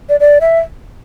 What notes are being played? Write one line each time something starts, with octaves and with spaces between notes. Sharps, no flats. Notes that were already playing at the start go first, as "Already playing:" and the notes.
D5
D5
E5